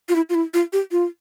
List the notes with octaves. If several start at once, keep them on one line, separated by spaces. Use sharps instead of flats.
F4
E4
F4
E4
F4
G4
F4